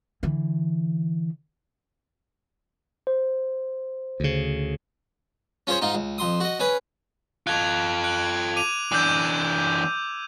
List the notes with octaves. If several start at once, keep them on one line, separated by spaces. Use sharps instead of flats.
D3 E3
C5
D2 C#3
C#4 F4 G#4 C5 C#5
G#2 D#4 F4
C#2
F2 C6 D#6
F#4 D#5
C#4 G#4 B4
F4 A4 F#6 G#6 F7
F#6 D7 F#7
D6 D#7 F7
E3 D4 D6 E6 G6